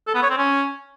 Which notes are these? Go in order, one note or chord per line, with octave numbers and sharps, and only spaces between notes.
A4
B3
C#5
C4
C#4